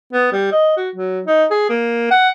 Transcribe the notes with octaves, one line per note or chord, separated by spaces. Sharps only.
B3
G3
D#5
F#4
F#3
D#4
G#4
A#3
F#5